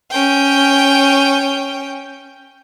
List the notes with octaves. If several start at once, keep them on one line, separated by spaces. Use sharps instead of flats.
C#4 G5